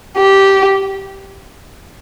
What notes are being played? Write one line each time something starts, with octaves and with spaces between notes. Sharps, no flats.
G4